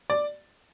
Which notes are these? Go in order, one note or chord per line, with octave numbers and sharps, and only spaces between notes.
D5